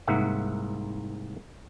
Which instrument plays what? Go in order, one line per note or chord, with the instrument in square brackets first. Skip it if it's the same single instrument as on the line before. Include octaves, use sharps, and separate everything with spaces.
[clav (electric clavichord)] C2 G#2 A#3 E5 F#5